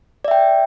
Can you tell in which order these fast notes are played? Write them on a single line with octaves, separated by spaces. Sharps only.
D5 E5 G5